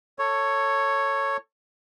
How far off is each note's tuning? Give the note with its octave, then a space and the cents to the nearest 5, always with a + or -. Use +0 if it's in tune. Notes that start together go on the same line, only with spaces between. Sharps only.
A4 +20 C#5 +0